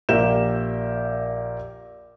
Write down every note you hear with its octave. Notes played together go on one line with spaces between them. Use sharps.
A#1 G4 A#4 E5 G6 E7